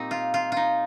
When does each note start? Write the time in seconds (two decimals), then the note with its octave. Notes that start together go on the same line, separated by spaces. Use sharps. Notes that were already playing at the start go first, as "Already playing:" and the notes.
Already playing: A#2 G3 A#3 C4 D#4
0.11 F4
0.34 F4
0.52 D#4 F4